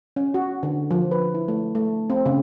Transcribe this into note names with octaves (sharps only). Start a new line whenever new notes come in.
C#4
F#4
D3
F3
B4
E4
A3
A3
C4
C#3